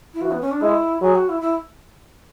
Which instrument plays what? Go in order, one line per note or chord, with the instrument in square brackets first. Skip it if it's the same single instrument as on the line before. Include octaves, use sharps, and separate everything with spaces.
[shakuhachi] E4
[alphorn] E3 [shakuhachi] F#4
[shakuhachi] B3
C#4
D4
[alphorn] G#3 [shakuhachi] E4
[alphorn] F#3 [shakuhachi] G#4
[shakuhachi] F#4
E4
E4